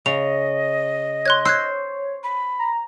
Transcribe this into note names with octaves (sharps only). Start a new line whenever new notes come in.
C#3 D#5 F7
C#5 C6 F#6 G#6
C5 E6 F#6 G#6
B5
A#5